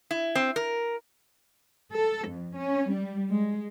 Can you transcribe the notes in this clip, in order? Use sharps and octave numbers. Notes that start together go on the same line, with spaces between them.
E4
C4
A#4
A4
F2
C#4
G3
G#3